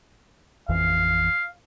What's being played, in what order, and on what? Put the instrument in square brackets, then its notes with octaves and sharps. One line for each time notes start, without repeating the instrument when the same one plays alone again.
[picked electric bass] A1 F2 E3 [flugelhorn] F5